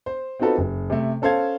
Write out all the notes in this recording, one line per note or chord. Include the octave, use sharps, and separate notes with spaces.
C5
C4 D#4 F4 F#4 A4 B4
F#1
C3 A3
C#4 A4 C5 F5 G#6